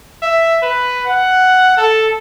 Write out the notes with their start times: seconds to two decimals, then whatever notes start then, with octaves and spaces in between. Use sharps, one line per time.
0.22 E5
0.63 B4
1.06 F#5
1.77 A4